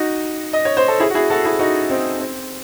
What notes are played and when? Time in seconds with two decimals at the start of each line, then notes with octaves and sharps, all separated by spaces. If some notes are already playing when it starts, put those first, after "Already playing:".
Already playing: D#4 F#4
0.53 D#5
0.65 C#5
0.77 C5
0.88 A4
1.00 E4 G#4
1.10 F#4
1.15 E4 G#4
1.30 F#4 A4
1.45 E4 G#4
1.59 D#4 F#4
1.90 C4 D#4
2.19 C4